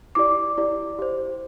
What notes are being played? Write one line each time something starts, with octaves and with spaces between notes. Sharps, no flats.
E4 G4 D5 D6
E4 G4 D5
G4 C5